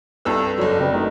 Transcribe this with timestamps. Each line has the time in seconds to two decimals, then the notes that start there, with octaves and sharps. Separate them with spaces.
0.25 C2 G2 G4 A4 B4 E6
0.58 F#1 D3 F#3
0.79 C#3 G3 C4 B4
0.93 D#3 A3 E4 F#4